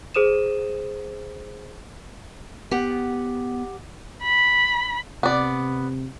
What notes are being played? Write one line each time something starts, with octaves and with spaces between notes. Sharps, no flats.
G#4 C5 D#6 D#7 E7
B3 G4 F#5
B5
C3 B3 D5